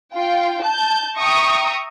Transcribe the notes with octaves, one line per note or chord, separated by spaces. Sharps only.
F4 G5
A5 G6
E5 G5 A#5 C#6 D#6